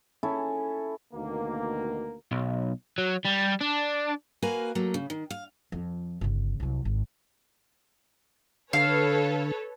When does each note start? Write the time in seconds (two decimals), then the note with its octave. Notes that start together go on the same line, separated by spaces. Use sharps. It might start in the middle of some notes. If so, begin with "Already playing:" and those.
0.23 C#4 E4 A4
1.14 D2 B2 D#3 A#3
2.31 B1
2.98 F#3
3.25 G3
3.61 D4
4.42 A#3 F#4 A#4 B4 F5 G#5
4.75 F#3 A3 A#3
4.94 C#3
5.10 D#3
5.30 F5
5.72 F2 F3
6.21 G1 C#3
6.60 C2 F#3
6.85 G#1
8.73 D3 A4 B4 C#5 F5